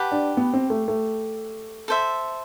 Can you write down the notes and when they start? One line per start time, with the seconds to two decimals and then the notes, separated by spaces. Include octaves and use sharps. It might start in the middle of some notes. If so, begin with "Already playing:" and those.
Already playing: G4 B4 F#5 A5
0.12 D4
0.37 B3
0.54 C4
0.70 A3
0.88 A3
1.88 A4 C5 E5